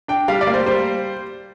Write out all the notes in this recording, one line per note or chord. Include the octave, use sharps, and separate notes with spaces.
D4 G5
G3 F5
D5
A#3
C5
G3 C5